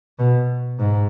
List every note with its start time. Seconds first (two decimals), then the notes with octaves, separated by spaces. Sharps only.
0.19 B2
0.79 G#2